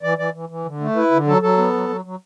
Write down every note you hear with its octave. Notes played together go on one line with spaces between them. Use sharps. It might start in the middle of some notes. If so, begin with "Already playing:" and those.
E3 D5
E3 D5
E3
E3
D3
A3
E4 B4
D3
F#3 A4
F#3 A4
B3
F#3
F#3
F#3